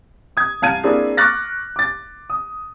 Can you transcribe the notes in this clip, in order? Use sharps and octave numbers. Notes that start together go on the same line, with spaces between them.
D#6 G#6
C2 F5 A5 G#6 D#7
A#3 C4 D4 E4 G#4
C#6 D6 F6 F#6 A6 A#6
D6 A6
D#6